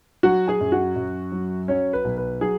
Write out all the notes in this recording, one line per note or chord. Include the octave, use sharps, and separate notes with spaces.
F#3 F#4 F#5
G#4 G#5
F#2
F#4 F#5
F#2
F#3
F#3 C#4 C#5
B4
B1
B4
F#3 G#4